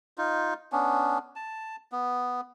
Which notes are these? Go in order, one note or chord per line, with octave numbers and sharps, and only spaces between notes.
D#4 F4
B3 C#4 D4
A5
B3